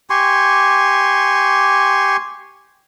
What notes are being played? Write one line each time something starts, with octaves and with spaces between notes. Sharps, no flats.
G4 G#5 C6 C#6